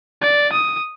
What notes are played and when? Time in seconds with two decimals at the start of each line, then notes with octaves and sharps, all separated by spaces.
0.21 D5
0.52 D#6